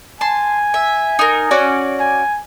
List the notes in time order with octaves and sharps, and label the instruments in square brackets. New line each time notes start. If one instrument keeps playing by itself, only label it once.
[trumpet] G#5 [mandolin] A5 C6
[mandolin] E5
D#4 A#4
C#4 F#4 D5
[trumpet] G#5